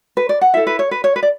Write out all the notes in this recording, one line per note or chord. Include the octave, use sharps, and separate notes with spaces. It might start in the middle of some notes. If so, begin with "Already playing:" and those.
B4
D5
F#5
E4 A4 E5
B4
C#5
B4
C#5
B4
D5